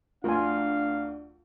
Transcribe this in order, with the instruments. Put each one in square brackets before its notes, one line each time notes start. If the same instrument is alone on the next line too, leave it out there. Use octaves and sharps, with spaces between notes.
[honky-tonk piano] D2 A#4 [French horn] D4 [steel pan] F4 G#5 [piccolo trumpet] F5